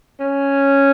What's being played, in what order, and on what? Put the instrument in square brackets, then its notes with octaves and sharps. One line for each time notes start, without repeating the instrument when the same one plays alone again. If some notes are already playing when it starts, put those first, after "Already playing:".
[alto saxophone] C#4